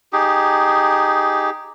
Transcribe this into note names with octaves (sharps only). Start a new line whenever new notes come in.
D#4 G4 G#4